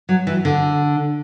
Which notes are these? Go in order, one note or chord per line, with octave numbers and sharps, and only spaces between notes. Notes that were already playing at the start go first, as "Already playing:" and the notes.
F#3
E3
D3